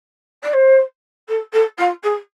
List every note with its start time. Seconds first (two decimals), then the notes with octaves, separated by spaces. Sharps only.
0.43 D5
0.53 C5
1.28 A4
1.52 A4
1.78 F4
2.03 G#4